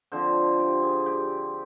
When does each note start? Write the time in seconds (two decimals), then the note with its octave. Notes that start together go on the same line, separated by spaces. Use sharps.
0.12 D3 F3 C4 C5
0.59 G4
0.82 G#4
1.06 G4